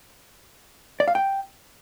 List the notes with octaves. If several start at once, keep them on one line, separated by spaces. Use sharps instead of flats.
D5
F5
G5